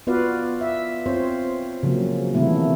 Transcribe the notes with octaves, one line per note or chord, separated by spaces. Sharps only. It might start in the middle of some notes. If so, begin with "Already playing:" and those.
B3 F4 F#4 B4 D5 F5
E5
C4 F4 C5 C#5
C#3 F3 F#3 A#3
C3 D#3 E3 A3 B3 E4